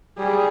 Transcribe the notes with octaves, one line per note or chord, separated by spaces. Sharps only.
G3 G#4